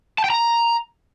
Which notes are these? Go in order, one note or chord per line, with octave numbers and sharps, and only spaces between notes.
A5
G5
A#5